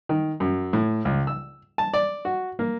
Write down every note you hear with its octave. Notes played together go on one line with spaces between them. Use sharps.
D#3
F#2
A2
C#2
E6
A5
D5
F#4
A#3